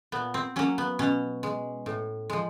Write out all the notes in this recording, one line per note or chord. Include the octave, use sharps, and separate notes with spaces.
A#2 B3
C4
F#3 A#3 C#4
B3
B2 C#4
G#3
A2
F3 G#3